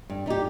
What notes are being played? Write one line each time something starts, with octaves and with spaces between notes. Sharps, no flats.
G2
G3 D#4 G4